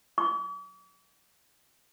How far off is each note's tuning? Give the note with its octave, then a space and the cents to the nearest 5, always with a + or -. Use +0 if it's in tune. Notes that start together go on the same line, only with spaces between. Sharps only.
D6 -45